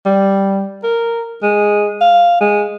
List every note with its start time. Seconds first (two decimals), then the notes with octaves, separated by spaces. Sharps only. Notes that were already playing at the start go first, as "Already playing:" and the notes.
0.05 G3
0.83 A#4
1.43 G#3
2.01 F5
2.40 G#3